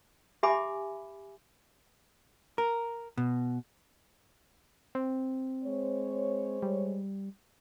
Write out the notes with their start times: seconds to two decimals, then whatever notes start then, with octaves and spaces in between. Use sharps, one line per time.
0.43 G4 E5 G#5 B5 D6
2.58 A#4
3.17 B2
4.95 C4
5.65 G#3 C5 C#5
6.63 G3